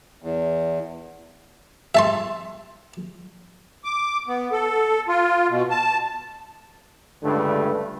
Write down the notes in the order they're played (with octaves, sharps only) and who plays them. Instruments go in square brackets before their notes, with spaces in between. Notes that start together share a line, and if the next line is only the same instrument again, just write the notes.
[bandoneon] E2
[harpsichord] E5 A5 C6
[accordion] D6
B3
A4
F4
B2
A5
[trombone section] C#2 G2 D3 G3 A3 B4